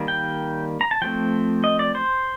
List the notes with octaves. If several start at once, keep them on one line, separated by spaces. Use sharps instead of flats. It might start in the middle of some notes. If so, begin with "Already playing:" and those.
Already playing: D#3 G3 A#3
G5
A#5
A5
F3 A3 C4 G5
D#5
D5
C5